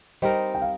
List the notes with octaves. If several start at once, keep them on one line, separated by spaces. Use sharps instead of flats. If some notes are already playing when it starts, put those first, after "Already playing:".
G3 C4 D#4 A#4 C5 D#5
G5
F5